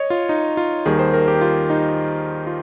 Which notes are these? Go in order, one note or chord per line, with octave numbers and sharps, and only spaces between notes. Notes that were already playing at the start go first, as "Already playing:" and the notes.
Already playing: C#5 D#5
F4
D#4
F4
D#2 D#3 G3 G#4
C5
A#4
G4
F4
D#4
F4